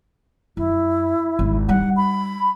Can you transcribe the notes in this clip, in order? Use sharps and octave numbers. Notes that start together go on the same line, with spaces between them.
F#2 E4
G#1
G3 D#4 F#5
B5